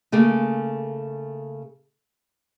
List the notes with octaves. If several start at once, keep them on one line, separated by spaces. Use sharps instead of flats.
C#3 A3 A#3 G#4